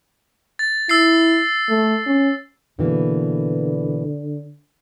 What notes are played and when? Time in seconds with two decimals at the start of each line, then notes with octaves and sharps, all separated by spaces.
0.59 A6
0.89 E4 E6 A6 C7
1.69 A3
2.06 C#4
2.79 B2 D3 E3 A#3